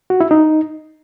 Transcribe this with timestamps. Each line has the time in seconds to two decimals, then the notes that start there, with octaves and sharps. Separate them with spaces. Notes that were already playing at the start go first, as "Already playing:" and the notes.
0.10 F#4
0.21 E4
0.31 D#4